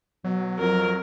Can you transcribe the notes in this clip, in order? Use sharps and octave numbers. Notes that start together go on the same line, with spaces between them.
B2 F#3
F2 A#4